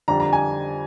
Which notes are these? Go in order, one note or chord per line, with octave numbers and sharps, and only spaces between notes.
F2 D3 G3 D4 A#5
A#5
G#5